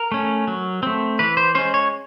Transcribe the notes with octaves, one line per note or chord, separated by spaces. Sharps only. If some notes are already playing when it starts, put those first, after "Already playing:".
Already playing: A#4
A3 C#4
F#3
A3 C4
E3 B4
C5
G#3 C#4 C5
C#5